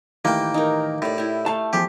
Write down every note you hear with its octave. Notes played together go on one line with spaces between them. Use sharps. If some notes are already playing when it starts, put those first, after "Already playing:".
A2 D#3 E3 A#3 G4 G5
D#4 A#4
A2 G4 D5
E4 G4
A3 F5 A5
E2 F3 G4 G#4